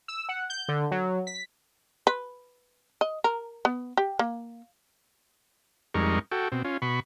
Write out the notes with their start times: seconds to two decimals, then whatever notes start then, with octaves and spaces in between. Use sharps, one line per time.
0.08 E6
0.29 F#5
0.50 G6
0.68 D3
0.91 F#3
1.27 B6
2.07 B4
3.01 D#5
3.24 A#4
3.65 B3
3.97 G4
4.19 A#3
5.94 F2 G3 G#3 D#4 A#4 C#6
6.31 F#4 A4 G5
6.52 B2 C4
6.65 C#4 F4
6.82 B2 B5 C#6